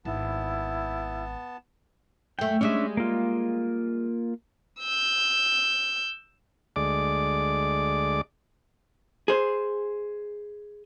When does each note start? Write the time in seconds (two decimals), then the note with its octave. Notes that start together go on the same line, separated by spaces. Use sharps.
0.05 G#1 B3 E4 A5
2.39 F#2 A3 G5
2.61 G3 G#3 C#4 D4 E5
2.97 A#3 F4
4.80 E6 G6
6.76 D2 G#3 D5 D6
9.28 G#4 C5